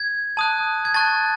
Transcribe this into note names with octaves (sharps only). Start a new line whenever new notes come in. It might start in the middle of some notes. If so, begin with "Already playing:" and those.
Already playing: G#6
A5 D#6 F#6
G#6
A5 C#6 F#6 A6